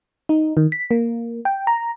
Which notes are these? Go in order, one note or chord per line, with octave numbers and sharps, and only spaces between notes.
D#4
D#3
B6
A#3
G5
A#5